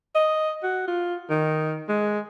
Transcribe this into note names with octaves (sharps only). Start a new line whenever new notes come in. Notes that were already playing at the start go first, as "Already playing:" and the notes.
D#5
F#4
F4
D#3
G#3